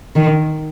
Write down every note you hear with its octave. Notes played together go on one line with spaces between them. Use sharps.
D#3